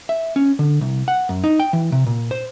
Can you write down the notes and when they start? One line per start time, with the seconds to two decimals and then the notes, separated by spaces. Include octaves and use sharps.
0.09 E5
0.36 C#4
0.59 D3
0.81 C2
1.08 F#5
1.29 F#2
1.44 D#4
1.60 G5
1.73 E3
1.92 C3
2.06 A#2
2.31 C5